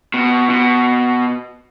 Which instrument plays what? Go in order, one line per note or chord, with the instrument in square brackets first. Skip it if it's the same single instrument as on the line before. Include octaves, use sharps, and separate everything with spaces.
[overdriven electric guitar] B2
B2